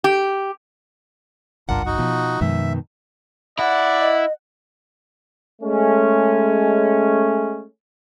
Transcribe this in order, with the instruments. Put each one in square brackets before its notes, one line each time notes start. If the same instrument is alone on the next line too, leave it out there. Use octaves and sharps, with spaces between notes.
[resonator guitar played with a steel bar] G4
[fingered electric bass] G#1 C#2 G2 [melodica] D4 F4 A#4 [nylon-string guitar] F#5
[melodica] D#4 F#4
[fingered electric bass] B2 [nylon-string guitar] F3
[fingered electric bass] F#2 F3 G#3 [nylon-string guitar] B2 D#3 [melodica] E5
[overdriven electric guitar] E4 [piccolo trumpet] D5 [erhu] F#5
[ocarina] D#5
[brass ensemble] G#3 A3 C#4